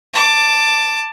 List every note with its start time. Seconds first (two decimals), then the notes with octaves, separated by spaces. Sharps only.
0.13 A5 D6